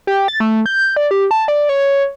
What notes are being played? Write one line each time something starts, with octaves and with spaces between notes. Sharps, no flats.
G4
A6
A3
G6
D5
G4
A5
D5
C#5